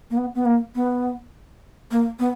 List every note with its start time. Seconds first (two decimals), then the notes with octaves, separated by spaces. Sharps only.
0.11 A#3
0.17 B3
0.35 B3
0.45 A#3
0.75 B3
1.91 A#3
2.19 B3